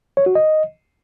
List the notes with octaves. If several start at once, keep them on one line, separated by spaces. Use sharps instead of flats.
C#5
F#4
D#5